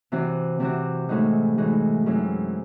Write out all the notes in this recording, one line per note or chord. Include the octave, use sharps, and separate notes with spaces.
C3 E3 C4 F#4
C3 E3 C4 F#4
A2 E3 G#3 D#4 F#4
A2 E3 G#3 D#4 F#4
F#2 E3 G#3 C4 E4